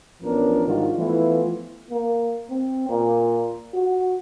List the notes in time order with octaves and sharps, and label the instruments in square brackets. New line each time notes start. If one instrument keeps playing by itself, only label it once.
[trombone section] A1 F3 B3 C#4 D4 A#4
G#2 D#3 G3 D4 F4 F#4
E3 F3 A3 B3 E4 F4
[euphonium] A#3
C4
A#2
F#4